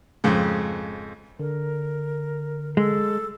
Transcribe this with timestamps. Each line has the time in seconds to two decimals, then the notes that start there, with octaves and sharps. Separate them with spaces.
0.24 F2 G#2 C#3
1.40 D3 A#4
2.77 G#3 A4